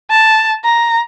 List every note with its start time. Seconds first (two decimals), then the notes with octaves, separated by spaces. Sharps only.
0.11 A5
0.64 A#5